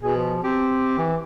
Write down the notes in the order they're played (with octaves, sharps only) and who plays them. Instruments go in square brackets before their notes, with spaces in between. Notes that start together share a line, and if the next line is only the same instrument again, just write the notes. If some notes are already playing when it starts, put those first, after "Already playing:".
[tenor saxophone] B2 [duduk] G#4
[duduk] F3
[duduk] C4 [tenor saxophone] G4
[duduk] E3